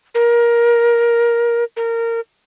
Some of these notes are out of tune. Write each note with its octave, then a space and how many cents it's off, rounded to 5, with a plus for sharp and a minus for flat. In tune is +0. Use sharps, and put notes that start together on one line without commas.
A#4 +15
A#4 -20